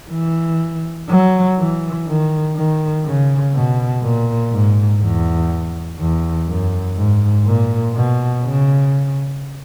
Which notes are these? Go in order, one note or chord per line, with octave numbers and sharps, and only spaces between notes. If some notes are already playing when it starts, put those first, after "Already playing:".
E3
F#3
E3
D#3
D#3
C#3
B2
A#2
G#2
E2
E2
F#2
G#2
A#2
B2
C#3